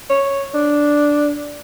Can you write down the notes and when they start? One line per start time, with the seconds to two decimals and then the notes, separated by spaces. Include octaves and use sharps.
0.10 C#5
0.54 D4